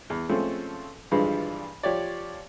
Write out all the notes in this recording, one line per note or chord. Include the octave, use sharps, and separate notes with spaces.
E2
F3 G#3 A3 C4 C#4
G2 D3 E3 F3 G3 G#3
F3 G4 C#5 D5